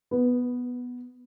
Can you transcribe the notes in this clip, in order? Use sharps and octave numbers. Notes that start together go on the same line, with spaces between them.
B3